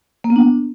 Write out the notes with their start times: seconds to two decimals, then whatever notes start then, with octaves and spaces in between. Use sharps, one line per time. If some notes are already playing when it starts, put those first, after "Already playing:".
0.24 A#3
0.30 B3
0.36 D4